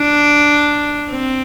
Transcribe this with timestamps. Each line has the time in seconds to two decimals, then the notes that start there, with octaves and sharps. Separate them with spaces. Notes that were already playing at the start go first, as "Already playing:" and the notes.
Already playing: D4
1.11 C4